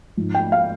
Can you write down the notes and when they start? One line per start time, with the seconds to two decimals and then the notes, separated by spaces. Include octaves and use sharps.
0.17 G#2 F3
0.35 G5
0.52 F5